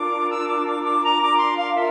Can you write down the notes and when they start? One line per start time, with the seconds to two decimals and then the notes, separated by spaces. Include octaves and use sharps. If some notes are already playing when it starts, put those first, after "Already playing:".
Already playing: D4 F4 A#4 D6
0.29 E6
0.48 D6
0.66 D6
0.83 D6
1.02 A#5
1.21 D6
1.38 C6
1.57 F5
1.74 F4 A#4 E5